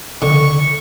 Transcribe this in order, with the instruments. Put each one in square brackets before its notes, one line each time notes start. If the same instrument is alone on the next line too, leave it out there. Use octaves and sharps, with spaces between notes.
[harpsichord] D3 [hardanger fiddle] C#6